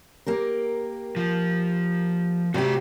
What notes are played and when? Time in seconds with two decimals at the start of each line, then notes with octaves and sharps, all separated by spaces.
0.26 A#3 G4 A#4
1.16 F3
2.54 C3 F#4 G4 D5